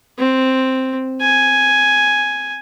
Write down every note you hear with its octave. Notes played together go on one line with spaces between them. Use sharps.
C4
G#5